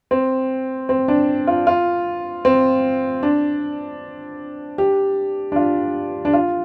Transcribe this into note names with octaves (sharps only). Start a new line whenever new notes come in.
C4
C4
D4
F4
F4
C4
D4
G4
D4
F4
D4
F4